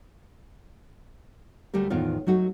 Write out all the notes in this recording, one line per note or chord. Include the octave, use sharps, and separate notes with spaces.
D2 G3 A3 G4 A#4
E2 A2 D#3 B3 F4 C5
F#3 A3 D#4 F#4